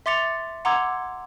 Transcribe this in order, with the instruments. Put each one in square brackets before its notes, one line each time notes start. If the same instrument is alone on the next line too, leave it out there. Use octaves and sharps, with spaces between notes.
[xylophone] E5 C6 D6 A6 C#7 F7
F#5 A#5 C6 D6 E6 G#6